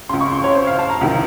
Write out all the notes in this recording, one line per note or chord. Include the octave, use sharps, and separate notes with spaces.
C#2 C#3 C6
C#6
C6
C#5
C5
F5
A5
A#5
C#2 C3 D#3